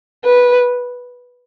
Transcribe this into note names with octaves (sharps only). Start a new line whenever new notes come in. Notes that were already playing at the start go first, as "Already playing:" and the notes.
B4